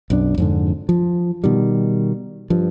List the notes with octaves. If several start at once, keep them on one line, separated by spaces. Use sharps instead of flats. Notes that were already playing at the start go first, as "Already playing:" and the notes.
B1 F#2 D4
F2 G#2 D3
F3
B2 D#3 G3
G2 F3